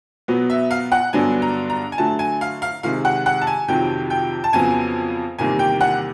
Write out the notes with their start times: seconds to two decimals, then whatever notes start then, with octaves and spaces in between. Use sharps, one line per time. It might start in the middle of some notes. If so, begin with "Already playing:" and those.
0.28 B2 F#3 B3
0.50 E5
0.71 F5
0.92 F#5
1.13 G2 D3 F#3 B3 D4 G#5
1.42 A#5
1.70 A#5
1.92 G#5
1.98 D3 F#3 A3 A5
2.19 G#5
2.41 F5
2.62 F5
2.83 C3 D#3 G#3 F5
3.05 F#5
3.26 F#5
3.41 A5
3.47 G#5
3.68 F2 C3 D#3 F#3 G5
4.10 G5
4.44 A5
4.53 F2 C#3 F#3 B3 G#5
5.39 E2 C3 D#3 G3 A#3 G#5
5.59 G5
5.81 F#5